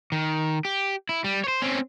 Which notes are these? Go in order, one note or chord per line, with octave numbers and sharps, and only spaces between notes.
D#3
G4
E4
G3
C5 C#5
C4 C#4